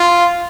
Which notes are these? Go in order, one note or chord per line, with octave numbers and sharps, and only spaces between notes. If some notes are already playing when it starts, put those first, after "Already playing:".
Already playing: F4